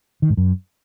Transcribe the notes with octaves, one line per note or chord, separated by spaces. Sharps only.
D#3
G#2
F#2